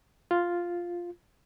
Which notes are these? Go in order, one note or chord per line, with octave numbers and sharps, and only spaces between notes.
F4